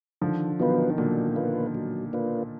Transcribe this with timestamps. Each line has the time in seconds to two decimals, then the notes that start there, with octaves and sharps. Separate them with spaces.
0.21 D3 D#3 F3
0.60 B2 D#3 F#3 B3 F4 B4
0.90 D#3
0.98 A#2 D3 F#3
1.36 A#3 F4 B4
1.75 F#3
2.13 A#3 D4 F4 B4